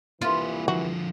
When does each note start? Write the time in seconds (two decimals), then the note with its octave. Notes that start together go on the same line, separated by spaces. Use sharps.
0.21 C2 E3 A#3 F4 B4
0.68 D3 F3 F#4